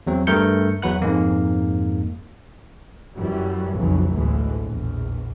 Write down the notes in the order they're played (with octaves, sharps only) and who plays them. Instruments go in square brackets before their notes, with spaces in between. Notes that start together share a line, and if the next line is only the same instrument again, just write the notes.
[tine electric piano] E2 F#3 C4
G2 A3 A#4 G6 C#7
E2 F#3 B4 F#5 F#6
F2 G#2 G#3 A#3
[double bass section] F#2 E3 F#3 G3
B1 F2 C#3 E3 F#3
A1 D2 B2 E3 G#3
A#1 E2